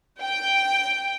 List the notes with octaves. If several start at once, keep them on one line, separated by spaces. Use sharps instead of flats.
G5